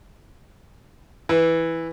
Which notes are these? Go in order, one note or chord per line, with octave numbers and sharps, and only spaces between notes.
E3